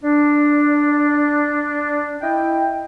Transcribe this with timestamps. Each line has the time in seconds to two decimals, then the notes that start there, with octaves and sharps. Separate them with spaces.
0.03 D4
2.22 E4 D#5 G5